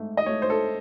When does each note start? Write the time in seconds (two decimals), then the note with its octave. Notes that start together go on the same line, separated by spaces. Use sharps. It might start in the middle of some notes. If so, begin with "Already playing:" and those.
Already playing: G#2 A3
0.17 D#5
0.26 A3 C#5
0.42 C5
0.50 A4